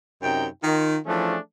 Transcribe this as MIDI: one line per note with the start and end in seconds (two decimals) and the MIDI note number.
0.22 0.47 42
0.22 0.47 48
0.22 0.47 63
0.22 0.47 79
0.64 0.97 51
0.64 0.97 65
1.06 1.36 52
1.06 1.36 53
1.06 1.36 57
1.06 1.36 61
1.06 1.36 62
1.06 1.36 68